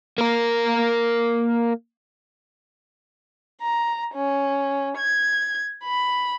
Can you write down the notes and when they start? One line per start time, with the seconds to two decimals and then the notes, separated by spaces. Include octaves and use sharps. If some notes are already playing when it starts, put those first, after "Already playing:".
0.18 A#3 A#4
3.62 A#5
4.14 C#4
4.98 G#6
5.84 B5